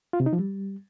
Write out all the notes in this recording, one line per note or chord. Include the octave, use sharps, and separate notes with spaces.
F4
C3
D#4
F3
G3